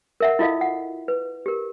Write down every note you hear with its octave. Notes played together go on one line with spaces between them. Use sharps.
A#4 E5 F#5
E4 F4 A4 D#5 F5
F#5
B4
G4 A#4